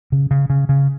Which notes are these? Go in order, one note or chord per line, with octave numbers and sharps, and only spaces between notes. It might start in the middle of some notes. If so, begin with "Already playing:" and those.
C#3
C#3
C#3
C#3